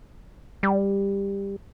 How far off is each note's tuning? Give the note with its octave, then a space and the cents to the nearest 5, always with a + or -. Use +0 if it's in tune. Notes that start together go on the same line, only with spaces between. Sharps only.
G3 +15